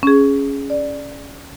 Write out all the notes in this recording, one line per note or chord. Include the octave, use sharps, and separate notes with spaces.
C#4 G#4
D5